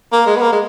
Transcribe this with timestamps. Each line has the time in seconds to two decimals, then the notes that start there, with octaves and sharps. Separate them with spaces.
0.12 A#3
0.27 G#3
0.36 B3
0.42 A#3
0.52 G#3